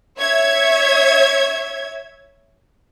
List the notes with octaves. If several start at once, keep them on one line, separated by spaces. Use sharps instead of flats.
C#5 E5 G#6